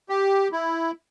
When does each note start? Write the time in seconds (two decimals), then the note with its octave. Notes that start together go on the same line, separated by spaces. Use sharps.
0.09 G4
0.52 E4